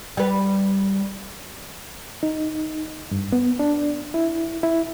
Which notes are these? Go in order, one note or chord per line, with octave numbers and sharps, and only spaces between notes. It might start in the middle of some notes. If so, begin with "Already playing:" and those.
G3 B4
D#4
G2
B3
D4
E4
E4